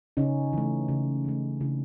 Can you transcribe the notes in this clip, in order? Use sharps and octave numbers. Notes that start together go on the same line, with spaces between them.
C#3 C#4 D#4
E3 A3
C#3
E3 A3
C#3 D4 E4